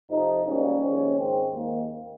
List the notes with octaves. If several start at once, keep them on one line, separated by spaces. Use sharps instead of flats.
F2 C3 F3 D#4
G#1 G#2 G3 A#3 C#4
D#2 C#3 F3 G#3 C4
G#2 D#3 G#3 C4
D#2 D#3 A#3